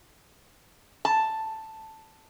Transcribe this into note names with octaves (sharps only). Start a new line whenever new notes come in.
A5